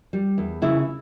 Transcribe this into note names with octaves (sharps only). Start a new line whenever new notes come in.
G3
E2
C#3 E4